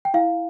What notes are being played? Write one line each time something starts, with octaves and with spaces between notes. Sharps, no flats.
G5
E4 F5